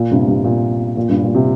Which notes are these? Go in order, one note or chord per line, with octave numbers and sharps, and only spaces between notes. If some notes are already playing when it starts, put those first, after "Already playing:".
Already playing: A#2
G2 C3
G2
A#2
A#2
G2
A#2
C3